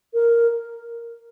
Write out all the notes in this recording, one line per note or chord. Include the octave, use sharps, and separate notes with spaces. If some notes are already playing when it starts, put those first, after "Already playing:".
A#4